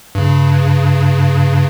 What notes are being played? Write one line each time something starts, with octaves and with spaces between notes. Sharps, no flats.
G2 C#3